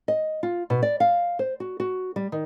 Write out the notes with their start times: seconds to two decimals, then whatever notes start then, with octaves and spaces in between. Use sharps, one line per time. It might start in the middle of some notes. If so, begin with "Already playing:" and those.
0.08 D#5
0.43 F4
0.70 B2
0.82 D5
1.00 F5
1.39 C5
1.60 F#4
1.80 F#4
2.16 G3
2.32 D#3